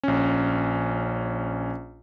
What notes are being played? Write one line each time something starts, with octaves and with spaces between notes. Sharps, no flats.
A#1 C#4